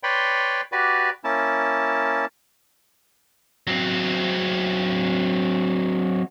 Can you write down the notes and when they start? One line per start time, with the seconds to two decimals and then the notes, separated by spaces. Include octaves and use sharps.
0.03 B4 C#5 D5 G5 B5 C6
0.72 F#4 G4 B4 D5
1.24 A#3 C#4 E4 A5
3.67 F#3 C4